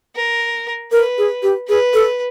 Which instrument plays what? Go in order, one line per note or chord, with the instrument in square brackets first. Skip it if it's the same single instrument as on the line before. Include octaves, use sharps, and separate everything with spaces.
[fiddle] A#4
[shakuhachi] A#4 [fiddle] B4
[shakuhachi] G#4
G4
[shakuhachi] G#4 [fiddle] B4
[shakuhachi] A4